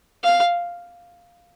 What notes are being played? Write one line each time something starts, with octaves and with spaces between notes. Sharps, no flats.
F5